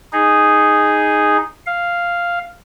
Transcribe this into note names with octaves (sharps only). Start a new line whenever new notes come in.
D#4 G#4
F5